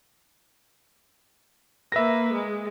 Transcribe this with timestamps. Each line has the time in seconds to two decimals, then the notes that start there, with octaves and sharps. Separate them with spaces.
1.92 A#3 B4 E5 A#6
2.33 G#3